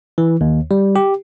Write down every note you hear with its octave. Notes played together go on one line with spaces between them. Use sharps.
E3
D#2
G3
G4